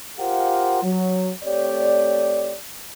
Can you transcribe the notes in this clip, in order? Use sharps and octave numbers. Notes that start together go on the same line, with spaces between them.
F4 G4 A#4 C5 F5 F#5
F#3
A3 C4 G4 C#5 D5